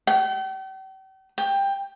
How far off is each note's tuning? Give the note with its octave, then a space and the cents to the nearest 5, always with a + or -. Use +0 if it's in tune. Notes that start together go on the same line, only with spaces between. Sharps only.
G5 -40
G5 +15